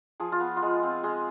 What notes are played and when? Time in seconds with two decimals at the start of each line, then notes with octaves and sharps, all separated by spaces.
0.20 F3 G#4
0.32 F4
0.40 B3
0.57 F4
0.62 G#3
0.83 C4
1.03 G#3 G#4